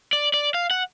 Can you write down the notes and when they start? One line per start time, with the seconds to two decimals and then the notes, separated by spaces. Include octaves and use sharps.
0.13 D5
0.34 D5
0.54 F5
0.71 F#5